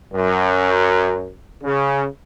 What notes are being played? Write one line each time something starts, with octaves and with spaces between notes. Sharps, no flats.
F#2
C#3